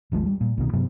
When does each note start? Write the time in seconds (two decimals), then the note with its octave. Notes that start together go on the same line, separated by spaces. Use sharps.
0.12 G#1 D#2 F3 G#3
0.26 G3
0.41 A#2
0.58 C2 B2 D#3
0.73 G2 C3 F#3 B3